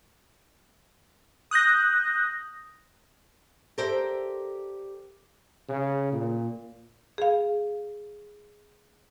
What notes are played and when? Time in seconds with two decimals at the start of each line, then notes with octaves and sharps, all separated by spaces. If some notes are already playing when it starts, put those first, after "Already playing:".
1.51 D#6 F#6 G6 A#6
3.78 G4 A4 A#4 C5 D5 E5
5.69 C#3
6.13 A#2
7.18 G#4 F5